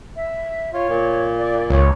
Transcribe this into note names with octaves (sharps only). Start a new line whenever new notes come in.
E5
F4 C#5
A#2
D5
C#2 C#5